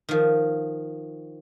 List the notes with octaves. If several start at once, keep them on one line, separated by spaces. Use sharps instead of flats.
D#3 F3